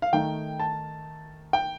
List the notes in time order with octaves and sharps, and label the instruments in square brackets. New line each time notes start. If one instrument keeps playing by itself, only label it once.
[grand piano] F5
D#3 A3 D#4 G5
A5
G5